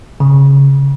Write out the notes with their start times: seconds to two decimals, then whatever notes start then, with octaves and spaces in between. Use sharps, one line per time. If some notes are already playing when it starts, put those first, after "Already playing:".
0.20 C#3